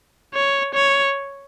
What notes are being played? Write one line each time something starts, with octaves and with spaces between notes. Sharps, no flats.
C#5
C#5